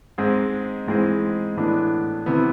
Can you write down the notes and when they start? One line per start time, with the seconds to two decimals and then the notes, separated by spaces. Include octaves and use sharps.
0.18 G#2 G#3 C4 G#4
0.87 G#2 E3 G#3 C4 G#4
1.57 A2 E3 B3 D4
2.26 C3 E3 B3